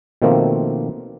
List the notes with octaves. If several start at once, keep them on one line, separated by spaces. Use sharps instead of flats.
B2 D#3 F3 A3 A#3 C4